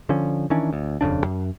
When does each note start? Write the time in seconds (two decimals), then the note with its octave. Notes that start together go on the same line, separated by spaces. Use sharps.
0.09 D3 F3 C#4
0.50 D#3 E3 C#4 D4
0.73 D2
1.01 D#1 F2 C#3 D4
1.24 F#2